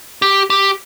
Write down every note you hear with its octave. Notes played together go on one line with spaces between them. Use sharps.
G4
G4